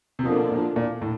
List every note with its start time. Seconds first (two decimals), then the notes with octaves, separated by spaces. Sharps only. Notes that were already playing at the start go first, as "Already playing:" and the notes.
0.19 C3
0.25 B2 D3 F3 A#3 D4 F4
0.51 A#2
0.76 A#2
1.02 A2